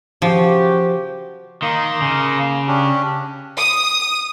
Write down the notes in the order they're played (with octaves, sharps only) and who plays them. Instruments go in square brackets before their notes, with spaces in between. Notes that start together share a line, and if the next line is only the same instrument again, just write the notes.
[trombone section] C#3 F#4 G4 [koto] F3
[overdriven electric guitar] D#3 [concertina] A#3 A#5 C6
[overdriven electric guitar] C#3
[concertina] C#4 D4 G4
[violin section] D#6